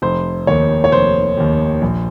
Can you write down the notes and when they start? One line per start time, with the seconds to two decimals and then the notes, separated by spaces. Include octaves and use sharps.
0.02 F1 C5
0.47 D#2 D#3 C#5
0.84 C#5
0.92 F1 C5
1.37 D#2 D#3
1.82 A#1